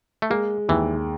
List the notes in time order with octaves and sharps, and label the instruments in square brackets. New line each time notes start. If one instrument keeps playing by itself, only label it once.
[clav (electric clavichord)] A3
[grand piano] G#3 [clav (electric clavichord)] A#3
[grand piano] D#2 [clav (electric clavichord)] E3